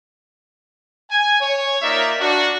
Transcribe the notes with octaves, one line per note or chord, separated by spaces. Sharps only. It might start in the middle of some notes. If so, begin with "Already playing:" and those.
G#5
C#5
A#3 D#4 F4 A#4 D5 E5
D4 F#4